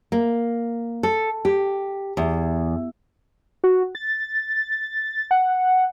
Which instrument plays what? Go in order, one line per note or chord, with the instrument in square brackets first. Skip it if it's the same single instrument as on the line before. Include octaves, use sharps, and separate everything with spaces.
[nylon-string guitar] A#3
A4
G4
E2
[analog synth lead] F#4
A6
F#5